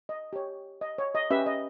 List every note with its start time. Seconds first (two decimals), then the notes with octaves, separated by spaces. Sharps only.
0.09 D#5
0.33 G4 C#5
0.81 D#5
0.98 C#5
1.15 D#5
1.30 C#4 G4 B4 E5
1.46 D#5